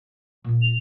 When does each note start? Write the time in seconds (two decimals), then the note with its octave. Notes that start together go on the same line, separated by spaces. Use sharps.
0.44 A#2 F4
0.62 F7